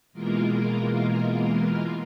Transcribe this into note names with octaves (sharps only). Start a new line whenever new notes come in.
B2 E3 G#3 A#3 F4 A#4